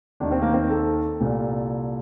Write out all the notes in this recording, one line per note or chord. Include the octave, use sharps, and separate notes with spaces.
D#2 D#3 D4
C4
A#3
C4
A4
C2 A#2